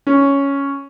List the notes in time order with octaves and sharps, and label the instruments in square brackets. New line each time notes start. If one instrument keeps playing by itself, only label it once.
[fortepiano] C#4